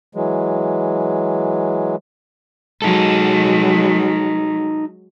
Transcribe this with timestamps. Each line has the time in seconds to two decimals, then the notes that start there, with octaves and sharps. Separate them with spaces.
0.15 E3 F#3 G#3
2.82 F#3 G#3 D#4 A4